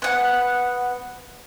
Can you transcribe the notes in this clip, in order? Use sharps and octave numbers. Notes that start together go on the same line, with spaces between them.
B3 F#5